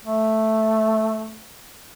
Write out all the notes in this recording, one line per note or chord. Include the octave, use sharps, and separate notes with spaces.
A3